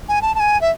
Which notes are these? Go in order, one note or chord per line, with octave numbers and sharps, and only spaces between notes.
G#5
A5
A5
G#5
E5